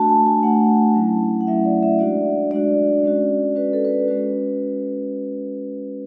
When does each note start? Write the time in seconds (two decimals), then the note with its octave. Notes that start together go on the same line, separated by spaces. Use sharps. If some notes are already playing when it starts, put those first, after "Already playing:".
Already playing: A3 D4 F#4 A5
0.09 G#5
0.26 G#5
0.43 A3 D4 F#4 F#5
0.95 F#3 A3 C#4 E4
1.41 F#5
1.47 F#3 A3 C#4 E4 E5
1.65 D5
1.83 E5
1.99 G#3 D4 F#4 D5
2.51 G#3 D4 F#4 D5
3.04 G#3 C#4 F#4
3.56 G#3 C#4 F#4 B4
3.73 A4
3.85 B4
3.91 A4
4.08 G#3 C#4 F#4 B4